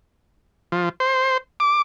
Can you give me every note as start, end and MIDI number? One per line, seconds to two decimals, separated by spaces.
0.72 0.89 53
1.00 1.38 72
1.60 1.82 86